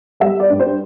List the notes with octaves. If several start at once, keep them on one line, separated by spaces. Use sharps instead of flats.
G3 E5
D5
G2
C5